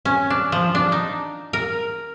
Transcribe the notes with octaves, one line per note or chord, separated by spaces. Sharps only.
C#4
D4
F3
D4
D#4
A#4